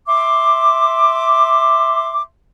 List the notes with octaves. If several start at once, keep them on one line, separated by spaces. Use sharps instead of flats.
E5 C6 D6